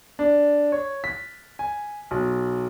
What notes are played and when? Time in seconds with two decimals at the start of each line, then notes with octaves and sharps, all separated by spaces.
0.19 D4
0.72 C#5
1.04 B6
1.59 G#5
2.11 B1